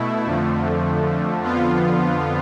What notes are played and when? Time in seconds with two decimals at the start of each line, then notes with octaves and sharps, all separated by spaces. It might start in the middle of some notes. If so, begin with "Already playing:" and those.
Already playing: B2 A3 E4
0.25 F2 D3 F3 A3
1.43 F2 D3 F3 B3 F4